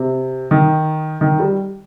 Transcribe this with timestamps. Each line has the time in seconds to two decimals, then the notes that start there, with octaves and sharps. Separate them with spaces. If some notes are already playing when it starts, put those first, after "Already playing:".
Already playing: C3
0.51 D#3
1.21 D#3
1.39 G3